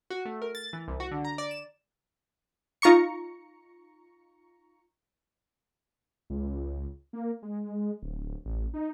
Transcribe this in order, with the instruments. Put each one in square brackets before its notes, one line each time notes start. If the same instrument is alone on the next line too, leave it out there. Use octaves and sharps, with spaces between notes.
[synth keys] F#4
A3
A#4
A6
E3
C2
F#4
D3
A#5
D5
E7
[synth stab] D#4 F4 A#5 C#6 C#7
[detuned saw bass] C#2
A#3
G#3
D1
A1
D#4